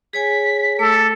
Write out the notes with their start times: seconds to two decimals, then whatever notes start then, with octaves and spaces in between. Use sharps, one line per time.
0.13 G#4 C#5 G#5 B6
0.79 A3 A4 D6